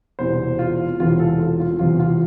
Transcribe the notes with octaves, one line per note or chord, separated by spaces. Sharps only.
E1 E2 C3 E3 C5
F4
E1 E2 C3 E3 F4
A4
F4
F4
E1 E2 C3 E3 F4
F4